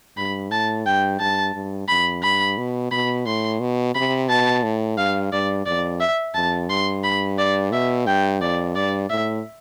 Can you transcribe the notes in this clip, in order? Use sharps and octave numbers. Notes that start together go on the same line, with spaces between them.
G2 B5
A2 A5
G2 G5
G2 A5
G2
F2 B5
G2 B5
B2
B2 B5
A2 C6
B2
C3 B5
B2 A5
A2
G2 F5
G2 D5
F2 D5
E5
F2 A5
G2 C6
B5
D5
B2 E5
G2 G5
F2 D5
G2 D5
A2 E5